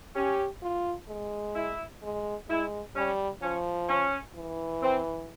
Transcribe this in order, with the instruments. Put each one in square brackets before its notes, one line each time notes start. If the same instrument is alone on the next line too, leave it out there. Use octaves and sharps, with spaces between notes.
[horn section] C#4 [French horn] G4
[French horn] F4
G#3
[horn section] E4
[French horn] G#3
[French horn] G#3 [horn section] E4
[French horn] G3 [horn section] C#4
[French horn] F3 [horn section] C#4
[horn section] C#4
[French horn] E3
[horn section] C4